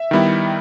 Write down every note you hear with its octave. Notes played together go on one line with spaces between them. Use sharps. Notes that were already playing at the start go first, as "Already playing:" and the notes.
Already playing: E5
D#3 G3 B3 E4